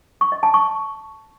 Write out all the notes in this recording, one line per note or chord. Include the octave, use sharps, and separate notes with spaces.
C#6
D#5
A5
C#6